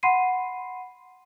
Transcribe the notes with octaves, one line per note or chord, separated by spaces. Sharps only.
F#5 B5 C6 C7 D#7